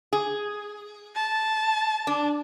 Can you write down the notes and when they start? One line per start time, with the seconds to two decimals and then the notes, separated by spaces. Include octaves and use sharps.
0.13 G#4
1.16 A5
2.07 D4